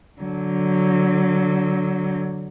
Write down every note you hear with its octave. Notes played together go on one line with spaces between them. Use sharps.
D3 F#3